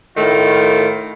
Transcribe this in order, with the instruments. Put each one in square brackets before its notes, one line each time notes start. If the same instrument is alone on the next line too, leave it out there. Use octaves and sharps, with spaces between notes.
[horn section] A2 D#3 A3 F4